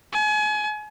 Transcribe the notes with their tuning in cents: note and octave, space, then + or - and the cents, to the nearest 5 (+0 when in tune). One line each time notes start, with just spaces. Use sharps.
G#5 +35